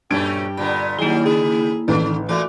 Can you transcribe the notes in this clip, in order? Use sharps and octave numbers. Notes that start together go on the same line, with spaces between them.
G2 A#2 A3 C#4 G4 G#6 D7
A#2 D3 B3 B5
D#3 F#3 G3 A#3 E4 G#4 E7
C#3 G#4
A1 D3 D#3
A#2 E3 A3 A#3 F#4 D5 D6